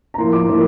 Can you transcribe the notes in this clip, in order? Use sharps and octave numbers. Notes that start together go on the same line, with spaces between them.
A#5
A2 F3 A#3 C6
D6
A2 F3 A#3